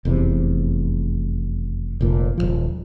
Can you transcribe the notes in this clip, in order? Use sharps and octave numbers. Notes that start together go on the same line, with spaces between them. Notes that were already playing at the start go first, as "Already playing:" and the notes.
F1 E2 A2 C3
F1 A#2
D#1 C2 F3